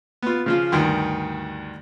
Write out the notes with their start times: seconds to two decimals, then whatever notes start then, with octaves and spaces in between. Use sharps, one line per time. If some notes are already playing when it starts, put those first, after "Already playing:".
0.22 B3 F4
0.46 C#3 F3 F4
0.72 D2 G2 D#3 C6